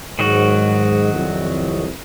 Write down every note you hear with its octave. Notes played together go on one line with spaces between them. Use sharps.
G#2 D#3 F#3 F#4
C2 F2